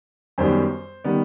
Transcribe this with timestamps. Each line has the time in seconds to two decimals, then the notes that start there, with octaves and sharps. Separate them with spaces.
0.38 F#2 D#3 G3 B3 C5
1.04 D#3 G3 B3